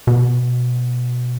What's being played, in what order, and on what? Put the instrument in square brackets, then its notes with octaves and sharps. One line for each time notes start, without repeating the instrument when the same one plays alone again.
[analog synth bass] B2